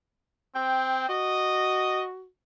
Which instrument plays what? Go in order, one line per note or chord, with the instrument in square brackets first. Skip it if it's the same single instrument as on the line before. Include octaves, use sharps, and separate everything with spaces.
[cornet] C4 [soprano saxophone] G5
[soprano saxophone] F#4 [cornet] D#5